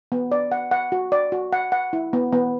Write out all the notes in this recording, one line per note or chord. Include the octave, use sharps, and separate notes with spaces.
B3
D5
F#5
F#5
F#4
D5
F#4
F#5
F#5
E4
B3
B3